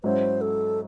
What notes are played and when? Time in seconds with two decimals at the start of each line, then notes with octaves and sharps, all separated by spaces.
0.04 G#2 F#3 C#4 E4 C5
0.41 A4